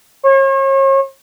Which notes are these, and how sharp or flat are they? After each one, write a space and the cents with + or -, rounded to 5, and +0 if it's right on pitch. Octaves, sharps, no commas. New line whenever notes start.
C#5 -40